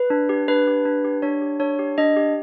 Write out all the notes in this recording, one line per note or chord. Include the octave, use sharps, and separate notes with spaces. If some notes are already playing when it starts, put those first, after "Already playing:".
Already playing: B4
D4
G4
D4 B4
G4
D4
G4
D4 C#5
G4
D4 C#5
G4
D4 D#5
G4